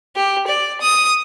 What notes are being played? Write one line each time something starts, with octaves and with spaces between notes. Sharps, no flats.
G4
D5
D#6